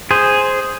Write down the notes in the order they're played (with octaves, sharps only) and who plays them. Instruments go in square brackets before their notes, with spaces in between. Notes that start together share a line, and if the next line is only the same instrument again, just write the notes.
[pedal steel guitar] G#4 C5